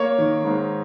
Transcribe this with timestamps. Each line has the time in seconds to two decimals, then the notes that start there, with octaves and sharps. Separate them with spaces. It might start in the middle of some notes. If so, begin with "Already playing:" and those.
Already playing: A#3 C#5
0.18 D#3
0.44 G#2